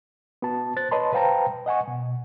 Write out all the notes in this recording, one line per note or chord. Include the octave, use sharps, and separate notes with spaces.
B3 F#4 A5
C5 F#6 A6
B4 C#5 D#5 A5 B5 C6
B4 C5 F5 G5 A5 A#5
D#5 F#5 G#5 C#6
B2